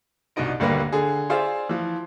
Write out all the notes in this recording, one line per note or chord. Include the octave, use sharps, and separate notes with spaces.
C2 B2 D4 D#4 D#5 D7
D#1 D2 G3 A#3 B4 A#6
D3 G#4
F4 G#4 C5 D5 E5 F5
E3 F3